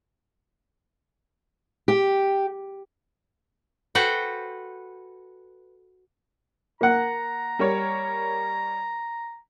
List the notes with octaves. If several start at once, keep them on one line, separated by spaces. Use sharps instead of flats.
G4
F#4 A4 B4 C5 F#5 G5
A#3 F#5 A#5
G3 A#4 C#5